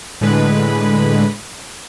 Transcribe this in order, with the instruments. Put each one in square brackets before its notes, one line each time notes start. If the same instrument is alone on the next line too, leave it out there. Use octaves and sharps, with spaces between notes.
[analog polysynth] A2 D3 G#3 B4